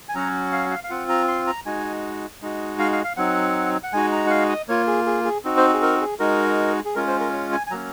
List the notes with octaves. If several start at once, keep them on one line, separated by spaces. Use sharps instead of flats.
G#5
F#3 C#4 F#4 A#5
F5
F5
F5
C4 F4 F#5
A#5
C6
A#5
G#3 D#4 F#4 G#5
G#3 D#4 F#4
F5
F5
F5
F#3 C4 D#4 F#5
F#5
G#3 D#4 F#4 G#5
A#5
F#5
F5
D#5
A#3 F4 C#5
G#4
G#4
G#4
C4 D#4 F#4
C5
G#4
A#4
G#4
G#3 D#4 F#4 A#4
G#4
G#3 C#4 F4 A#4
C5
A#4
C#5
G#5
G#5
F#3 A#3 C#4 A#5